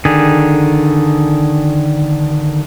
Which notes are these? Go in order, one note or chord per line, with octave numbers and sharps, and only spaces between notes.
D3 D#3 G#4